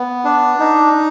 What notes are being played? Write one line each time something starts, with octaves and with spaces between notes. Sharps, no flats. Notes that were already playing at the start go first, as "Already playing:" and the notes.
Already playing: B3
D4
D#4